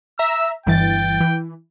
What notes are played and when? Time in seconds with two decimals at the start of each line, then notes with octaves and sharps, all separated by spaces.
0.19 E5 A#5 E6
0.66 G1 E3 G5 A6
1.20 E3